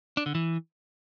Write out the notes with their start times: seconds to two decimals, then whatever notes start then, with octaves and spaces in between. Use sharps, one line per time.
0.17 D4
0.26 D3
0.35 E3